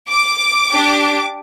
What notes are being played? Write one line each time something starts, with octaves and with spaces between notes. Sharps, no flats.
D6
D4 G4